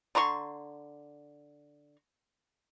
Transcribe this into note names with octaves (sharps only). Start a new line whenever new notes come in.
D3 A#5 C6 C#6